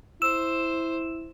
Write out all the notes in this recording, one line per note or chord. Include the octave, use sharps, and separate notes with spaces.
E4 C5 E6 E7